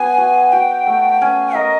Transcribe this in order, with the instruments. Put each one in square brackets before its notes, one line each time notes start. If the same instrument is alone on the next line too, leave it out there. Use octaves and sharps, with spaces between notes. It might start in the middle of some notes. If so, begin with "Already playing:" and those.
Already playing: [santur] F#3 B3 D4 [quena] G#5
[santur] F#4
[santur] F#4 [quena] G5
[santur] A3
[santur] C#4 [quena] G#5
[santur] A#4 [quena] D#5